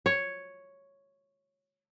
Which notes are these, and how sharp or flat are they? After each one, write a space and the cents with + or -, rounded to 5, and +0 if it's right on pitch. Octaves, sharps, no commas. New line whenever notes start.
C#5 +0